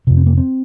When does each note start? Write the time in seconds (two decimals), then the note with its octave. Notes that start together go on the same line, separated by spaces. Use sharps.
0.07 F2 C3
0.17 C4
0.26 A#3
0.37 C4